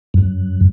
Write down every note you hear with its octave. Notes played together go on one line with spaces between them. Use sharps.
F#2